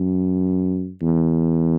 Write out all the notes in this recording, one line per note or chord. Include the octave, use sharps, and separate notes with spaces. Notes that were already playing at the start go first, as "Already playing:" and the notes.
Already playing: F#2
E2